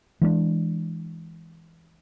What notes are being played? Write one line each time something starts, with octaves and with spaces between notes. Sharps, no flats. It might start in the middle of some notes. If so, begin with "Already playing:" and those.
E3 G#3 A3 D4